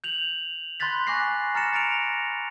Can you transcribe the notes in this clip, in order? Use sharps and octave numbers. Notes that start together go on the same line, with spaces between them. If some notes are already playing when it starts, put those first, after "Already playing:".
G6 F7 F#7
B5 C6 F#6 G6 A6 B6
G#5 C#6 D6 F#6 A#6 C7
A#5 F6 A6 A#6 C#7 E7
A6 A#6 D7 F7